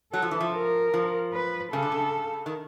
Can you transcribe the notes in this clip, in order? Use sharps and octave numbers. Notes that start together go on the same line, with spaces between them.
F#3 A4
F3
E3
F3
A#4
F3
B4
C#3 A4
D3
C#3
D#3